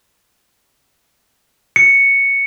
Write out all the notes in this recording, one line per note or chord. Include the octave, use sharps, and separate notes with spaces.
C#7